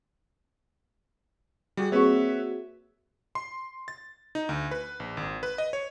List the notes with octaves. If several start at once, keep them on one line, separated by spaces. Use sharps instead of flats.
G3 F#4 G#4
A#3 C4 F#4 G#4 B4 C#5 E5 C#6
C6
A6
D#4
D2
B4
A#1
G#1
B4
D#5
C#5